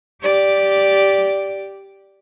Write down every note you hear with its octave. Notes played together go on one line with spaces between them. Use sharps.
G4 D5